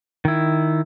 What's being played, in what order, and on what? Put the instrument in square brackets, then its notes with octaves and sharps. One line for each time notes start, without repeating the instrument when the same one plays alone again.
[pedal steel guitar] D#3 E4